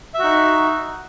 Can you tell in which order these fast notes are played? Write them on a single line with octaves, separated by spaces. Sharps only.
E5 F#4 D#4